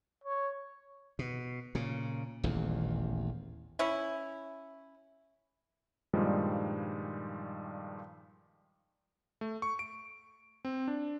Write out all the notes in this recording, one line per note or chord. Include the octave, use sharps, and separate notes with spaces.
C#5
B2
A#2 C#3
D#1 A1 E2
C#4 E4
G2 A#2 D#3 F3 G3 G#3
A3
C#6
D7
C4
D4